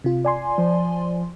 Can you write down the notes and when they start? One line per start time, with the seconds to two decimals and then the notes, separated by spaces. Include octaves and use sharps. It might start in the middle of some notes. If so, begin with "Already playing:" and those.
0.04 C3 F4
0.25 D5 G#5 C6
0.58 F3